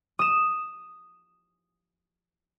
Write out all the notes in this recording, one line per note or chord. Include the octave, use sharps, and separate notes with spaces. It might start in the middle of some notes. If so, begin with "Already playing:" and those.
D#6 E7